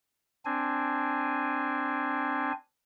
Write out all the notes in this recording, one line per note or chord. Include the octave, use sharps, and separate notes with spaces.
C4 D4 G#5